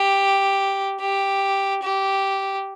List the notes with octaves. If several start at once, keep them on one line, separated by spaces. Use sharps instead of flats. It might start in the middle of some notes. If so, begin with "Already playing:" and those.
Already playing: G4
G4
G4